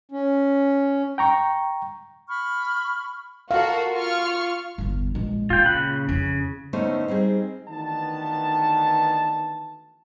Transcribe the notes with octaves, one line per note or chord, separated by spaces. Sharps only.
C#4
G5 A#5 C#6
B5 C#6 F6
F#4 A4 A#4 F5
F4 C#6 F6
G1 E2
A#1 G#3
A#2 F4 G5
C#3 B5 F#6
F2 C#3 E4
D2 A3 B3 C#4 D#4 C5
G3 C4 D#4 G#4
D2 D#3 E3 B3 A5